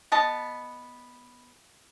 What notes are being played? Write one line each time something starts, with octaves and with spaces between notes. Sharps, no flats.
B3 D#5 A5